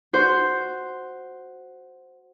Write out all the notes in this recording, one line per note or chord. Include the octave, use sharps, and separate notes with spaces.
F#4 C5